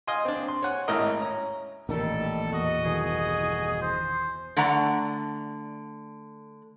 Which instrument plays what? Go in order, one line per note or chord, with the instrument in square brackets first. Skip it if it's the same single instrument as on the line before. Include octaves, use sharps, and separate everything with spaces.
[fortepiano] D#5 F5 G#5 C6
C4 D4
C6
C#5 F#5 G#5
G#1 A2 E4 A#4 D#5
C#4 A#5
[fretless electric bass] A1 D#3 [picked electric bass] A#2 [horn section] G3 A4
[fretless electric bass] E2 [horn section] F#4 D#5
[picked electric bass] G1 B2 D#3 [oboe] G#4
[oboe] C5
[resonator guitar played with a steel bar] D3 A3 D5 F#5 A#5